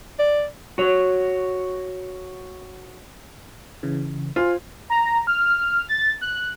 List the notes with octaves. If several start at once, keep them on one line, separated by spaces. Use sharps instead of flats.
D5
F#4 C#5
C#3 E3
F4 C5 G#5
A#5
F6
A6
F#6